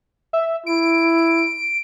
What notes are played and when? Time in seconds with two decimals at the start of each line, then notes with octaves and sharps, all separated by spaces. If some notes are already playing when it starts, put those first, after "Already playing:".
0.33 E5
0.66 E4 D7